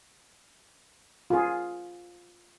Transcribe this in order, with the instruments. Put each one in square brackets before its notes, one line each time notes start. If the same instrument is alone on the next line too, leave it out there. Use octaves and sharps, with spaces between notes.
[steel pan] F4 G#4